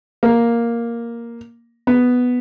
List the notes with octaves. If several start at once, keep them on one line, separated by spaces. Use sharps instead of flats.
A#3
B3